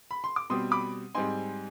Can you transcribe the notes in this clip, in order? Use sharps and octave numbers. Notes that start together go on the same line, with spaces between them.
B5
C6
D6
B2 G3 C4 C6 D#6
B5 D6
G#2 G3 C4 D#4 G#5 C6